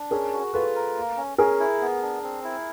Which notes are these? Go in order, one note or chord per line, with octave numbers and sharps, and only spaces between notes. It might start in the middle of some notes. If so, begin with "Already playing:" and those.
Already playing: D4
C#4 G#4 A#4
F#4
F4 A4 B4
A#4
A#3
C#4
C#4 G#4 A#4
E4
B3
D4
C4
E4